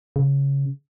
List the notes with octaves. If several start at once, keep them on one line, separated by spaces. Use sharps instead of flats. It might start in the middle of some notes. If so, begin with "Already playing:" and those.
C#3